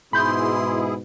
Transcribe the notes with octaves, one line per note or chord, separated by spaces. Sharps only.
G#2 B2 E4 G#4 B5 C6 G6